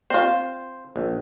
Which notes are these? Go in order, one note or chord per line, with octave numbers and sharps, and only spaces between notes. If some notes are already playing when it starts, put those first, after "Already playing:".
C4 F4 C5
A#1